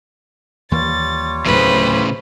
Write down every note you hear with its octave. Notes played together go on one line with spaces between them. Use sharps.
D#2 E3 G3 A#3 F4 C#5 A6
D1 B1 A2 C#3 F#3 B4 C5